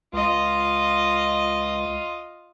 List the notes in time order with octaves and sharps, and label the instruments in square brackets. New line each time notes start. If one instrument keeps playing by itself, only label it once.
[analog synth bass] C#2 [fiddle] F4 D#5